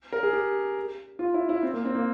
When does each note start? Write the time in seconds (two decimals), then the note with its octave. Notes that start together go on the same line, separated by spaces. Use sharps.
0.13 A#4
0.23 G#4
0.33 G4
1.19 F4
1.34 E4
1.49 E4
1.63 C4
1.73 A#3
1.85 C4
1.95 A#3